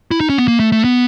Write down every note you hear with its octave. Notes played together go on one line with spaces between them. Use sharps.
E4
D#4
C#4
B3
A#3
A3
A3
B3